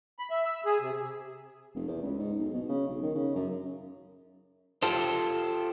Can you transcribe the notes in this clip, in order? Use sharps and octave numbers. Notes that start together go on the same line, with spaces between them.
B5
E5
E6
G#4
C3
F1
E2
C#2
G#2
B1
B2
C#3
B1
D#3
C#3
F#2
F4 G4 A4 C5